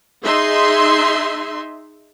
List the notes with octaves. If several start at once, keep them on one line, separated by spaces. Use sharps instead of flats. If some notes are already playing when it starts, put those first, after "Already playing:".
D#4 G#4 E5 C6